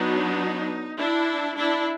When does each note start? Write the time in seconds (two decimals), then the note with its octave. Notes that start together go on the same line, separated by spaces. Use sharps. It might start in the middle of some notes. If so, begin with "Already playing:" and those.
Already playing: F#3 B3 D4 D#4
0.98 D4 E4
1.57 D4 E4